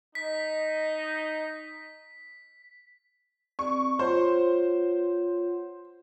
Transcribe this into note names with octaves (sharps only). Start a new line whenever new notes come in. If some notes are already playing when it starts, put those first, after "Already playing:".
D#4 B6
C4 D5 C#6
F4 C5 C#5 F#5